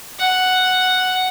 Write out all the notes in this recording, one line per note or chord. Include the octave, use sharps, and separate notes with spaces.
F#5